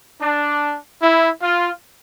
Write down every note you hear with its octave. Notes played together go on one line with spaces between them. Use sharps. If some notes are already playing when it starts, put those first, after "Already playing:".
D4
E4
F4